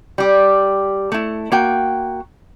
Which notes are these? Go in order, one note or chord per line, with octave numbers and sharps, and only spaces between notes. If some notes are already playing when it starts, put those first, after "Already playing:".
G3 G4
A3 E4
A#3 F#4 G5